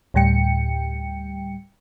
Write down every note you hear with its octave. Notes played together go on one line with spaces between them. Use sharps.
D2 A2 G3 G5 C#7